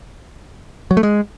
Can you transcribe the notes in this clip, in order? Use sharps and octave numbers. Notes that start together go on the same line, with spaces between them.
F#3
A3
G#3